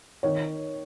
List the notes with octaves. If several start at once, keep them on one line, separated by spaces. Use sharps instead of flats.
D#3 C#5